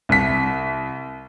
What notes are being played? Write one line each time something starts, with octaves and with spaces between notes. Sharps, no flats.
C2 B6